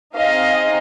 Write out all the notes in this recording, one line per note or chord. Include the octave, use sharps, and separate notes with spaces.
C4 D#4 G#4 D#5 F5